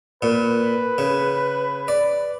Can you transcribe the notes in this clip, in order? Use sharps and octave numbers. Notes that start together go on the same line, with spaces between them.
A#2 B4
C#3
D5